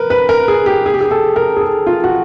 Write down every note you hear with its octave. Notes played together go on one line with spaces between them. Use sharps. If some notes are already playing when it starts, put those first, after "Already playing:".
Already playing: A#4 B4
B4
A#4
G#4
G4
G#4
G4
G#4
A4
A#4
G#4
A4
F4
F#4